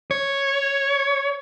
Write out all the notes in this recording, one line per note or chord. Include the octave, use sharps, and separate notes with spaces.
C#5